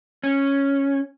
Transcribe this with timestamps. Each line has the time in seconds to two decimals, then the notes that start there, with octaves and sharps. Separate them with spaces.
0.24 C#4